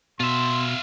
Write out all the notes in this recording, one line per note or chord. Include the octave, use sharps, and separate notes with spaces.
B2 F4 E5 C6